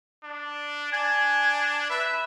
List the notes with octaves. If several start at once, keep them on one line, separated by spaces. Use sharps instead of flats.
D4
D4 G#5
B4 E5